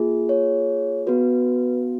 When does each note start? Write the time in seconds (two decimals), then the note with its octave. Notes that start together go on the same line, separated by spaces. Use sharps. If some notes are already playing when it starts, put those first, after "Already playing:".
Already playing: A#3 F4 G#4
0.29 C#5
1.07 B3 F#4 B4